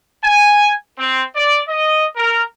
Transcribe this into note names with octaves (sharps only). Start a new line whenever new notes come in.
G#5
C4
D5
D#5
A#4